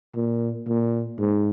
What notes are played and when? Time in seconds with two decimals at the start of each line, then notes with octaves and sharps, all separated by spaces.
0.16 A#2
0.67 A#2
1.20 G#2